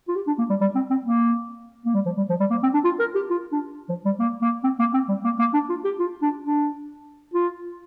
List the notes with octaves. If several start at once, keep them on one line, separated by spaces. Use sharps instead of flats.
F4
G4
D4
A#3
G3
G3
C4
C4
A#3
A#3
G3
F3
G3
F3
G3
A#3
C4
D4
F4
A#4
G4
F4
D4
F3
G3
A#3
A#3
C4
A#3
C4
G3
A#3
A#3
D4
F4
G4
F4
D4
D4
F4